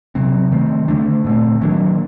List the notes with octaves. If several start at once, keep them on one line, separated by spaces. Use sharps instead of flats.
C3 F#3 C4
D#3 A3 C4
D3 F#3 A3 D4
A#2 A3 C4
D#3 F#3 A#3 D4